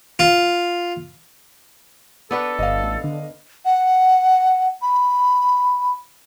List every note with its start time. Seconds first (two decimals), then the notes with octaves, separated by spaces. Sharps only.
0.19 F4
2.31 B3 D4 A4 B4
2.59 G1 D#5 F5
2.83 A1
3.04 D3
3.65 F#5
4.82 B5